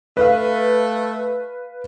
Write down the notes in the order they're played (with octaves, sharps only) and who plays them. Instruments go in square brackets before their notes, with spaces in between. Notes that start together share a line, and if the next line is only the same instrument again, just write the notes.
[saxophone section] A3 [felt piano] B4 F5